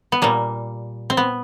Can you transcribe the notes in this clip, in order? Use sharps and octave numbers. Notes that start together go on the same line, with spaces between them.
B3
A#2 G3 A#3
C4
B3